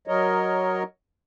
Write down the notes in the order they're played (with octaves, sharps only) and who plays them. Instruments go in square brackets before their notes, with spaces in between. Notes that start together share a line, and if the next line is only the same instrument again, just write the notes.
[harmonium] F#3 A#4 C#5 D#5